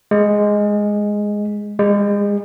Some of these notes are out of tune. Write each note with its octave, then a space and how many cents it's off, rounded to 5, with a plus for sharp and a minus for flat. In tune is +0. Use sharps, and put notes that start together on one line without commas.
G#3 +0
G#3 -30